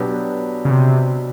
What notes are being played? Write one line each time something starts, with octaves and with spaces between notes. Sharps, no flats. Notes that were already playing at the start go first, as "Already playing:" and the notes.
Already playing: B2 F#3 B3 D4 G4
C#3
C3